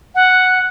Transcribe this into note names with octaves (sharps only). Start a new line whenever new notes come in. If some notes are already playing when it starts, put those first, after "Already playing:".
F#5